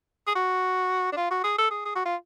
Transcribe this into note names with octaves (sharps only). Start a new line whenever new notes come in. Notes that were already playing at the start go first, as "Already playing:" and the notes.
G#4
F#4
D4
F4
F#4
G#4
A4
G#4
G#4
F#4
F4